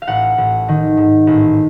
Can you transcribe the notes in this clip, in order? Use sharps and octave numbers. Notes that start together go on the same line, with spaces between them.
F5
A1 F#5
A1
D#3
G#2
A1